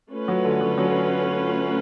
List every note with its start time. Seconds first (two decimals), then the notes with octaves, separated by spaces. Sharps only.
0.12 A3 C#4 F4 B4
0.28 F#3
0.45 D3
0.61 F#3
0.78 F#3